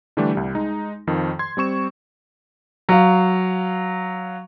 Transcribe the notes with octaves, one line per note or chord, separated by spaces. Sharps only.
D3 E3 G3 A3 D4 G4
C2 G3
G#3 D#4
F2 D#3 F3
C6 G#6
G3 C4 C#6 E7
F#3 F5